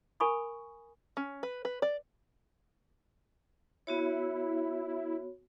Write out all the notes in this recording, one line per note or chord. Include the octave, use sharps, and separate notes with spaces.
A#4 G#5 B5 C#6 D#6
C#4
B4
B4
D5
B3 E4 F#4 C#5